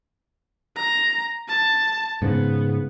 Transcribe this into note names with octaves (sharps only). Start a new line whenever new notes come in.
A#5
A5
G#2 C#3 B3